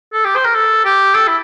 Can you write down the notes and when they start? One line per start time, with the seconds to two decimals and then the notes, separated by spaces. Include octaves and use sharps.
0.13 A4
0.25 G4
0.36 C5
0.45 A#4
0.54 A4
0.85 G4
1.14 A4
1.27 E4